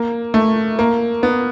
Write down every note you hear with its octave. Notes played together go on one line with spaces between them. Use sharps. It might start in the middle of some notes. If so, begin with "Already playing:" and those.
Already playing: A#3
A3
A#3
B3